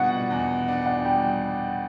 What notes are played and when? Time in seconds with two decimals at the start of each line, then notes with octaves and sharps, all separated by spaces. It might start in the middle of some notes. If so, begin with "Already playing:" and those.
Already playing: B2 G3 D4 F#5
0.31 E2
0.68 D4
0.86 F#5
1.05 G3 G5